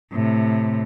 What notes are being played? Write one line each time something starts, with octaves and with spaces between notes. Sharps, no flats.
A2 C3